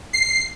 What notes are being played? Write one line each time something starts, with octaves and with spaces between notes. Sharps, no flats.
C7